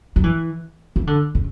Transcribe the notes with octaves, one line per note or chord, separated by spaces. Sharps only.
F#3
E3
E3
D3
C#3